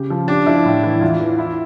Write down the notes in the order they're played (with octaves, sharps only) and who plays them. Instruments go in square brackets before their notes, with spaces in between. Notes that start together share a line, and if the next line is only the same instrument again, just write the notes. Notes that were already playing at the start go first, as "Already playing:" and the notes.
Already playing: [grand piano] C#3 G4
F3
[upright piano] D4 [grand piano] G4
[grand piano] F3 [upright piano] E4
[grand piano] A2
E3
[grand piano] E2 [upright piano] F4
[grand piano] E3
E4